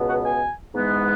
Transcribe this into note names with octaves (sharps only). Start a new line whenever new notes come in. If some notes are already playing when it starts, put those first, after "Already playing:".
Already playing: C#2 B2 B3
F#5
G#5
G#2 E3 G#3 B3